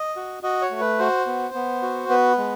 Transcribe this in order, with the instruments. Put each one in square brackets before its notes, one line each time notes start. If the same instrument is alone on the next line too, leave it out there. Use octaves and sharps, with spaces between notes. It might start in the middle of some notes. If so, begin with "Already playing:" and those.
Already playing: [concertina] D#5
F#4
F#4 D#5
C#5
A3
B4
F#4 C5
B3
B3
F#4
B3 B4
G#3